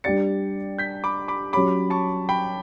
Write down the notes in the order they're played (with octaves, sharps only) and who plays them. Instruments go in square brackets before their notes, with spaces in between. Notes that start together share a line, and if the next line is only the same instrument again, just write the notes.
[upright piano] G3 D4 G4 D5 [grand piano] A6 C#7
[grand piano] G6 B6
B5 D6
B5 D6
[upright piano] F#3 C#4 G4 C#5 [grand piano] B5 D6
[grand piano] A5 C#6
G5 B5